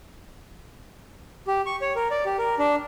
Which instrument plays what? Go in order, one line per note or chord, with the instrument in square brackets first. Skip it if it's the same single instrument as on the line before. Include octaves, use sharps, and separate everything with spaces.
[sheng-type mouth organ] G4
C#6
C#5
A#4
D5
G4
A#4
D4